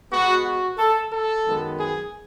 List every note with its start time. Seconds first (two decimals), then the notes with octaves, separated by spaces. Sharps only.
0.11 B2 G#3 B3 F#4
0.45 F#4
0.78 A4
1.12 A4
1.45 F#2 D#3 G#3 B3
1.79 G#4